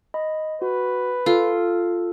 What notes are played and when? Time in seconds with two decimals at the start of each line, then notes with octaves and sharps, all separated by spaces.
0.14 D#5 B5
0.62 F#4 B4
1.26 F4 A4